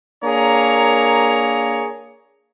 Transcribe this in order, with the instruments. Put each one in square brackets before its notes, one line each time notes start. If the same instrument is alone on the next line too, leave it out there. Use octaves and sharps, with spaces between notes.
[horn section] A#3 D4 G#4 C#5 A#5